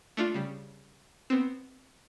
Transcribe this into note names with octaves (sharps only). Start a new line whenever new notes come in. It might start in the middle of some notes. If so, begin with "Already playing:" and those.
A3 D4 F4
C#3 G3
B3 C4